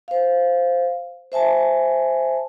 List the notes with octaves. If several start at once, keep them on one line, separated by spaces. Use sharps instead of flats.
C5 F5
C5 E5 G#5 A5